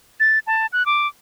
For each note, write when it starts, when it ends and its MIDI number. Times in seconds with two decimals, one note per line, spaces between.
0.20 0.39 93
0.47 0.67 81
0.73 0.85 90
0.86 1.07 86